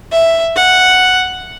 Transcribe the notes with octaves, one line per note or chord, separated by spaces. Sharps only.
E5
F#5